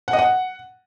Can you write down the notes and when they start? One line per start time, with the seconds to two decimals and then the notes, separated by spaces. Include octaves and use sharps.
0.08 F#5
0.13 D#5
0.19 F#5